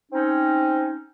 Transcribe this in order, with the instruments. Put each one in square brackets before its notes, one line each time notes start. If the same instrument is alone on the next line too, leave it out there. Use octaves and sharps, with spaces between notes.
[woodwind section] C4 C#4 D#4